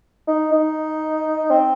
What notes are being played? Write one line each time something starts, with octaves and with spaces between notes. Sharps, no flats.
D#4
D#4
C4